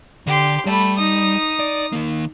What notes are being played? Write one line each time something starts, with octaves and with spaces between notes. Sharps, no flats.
D3 G4 C6
G3 A3 B5
D#4 D#6
D5
D#3 A#3